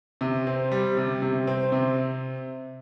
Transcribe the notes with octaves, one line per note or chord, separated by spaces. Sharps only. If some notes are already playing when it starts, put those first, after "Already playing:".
C3
C4
G3
C3
C3
C4
C3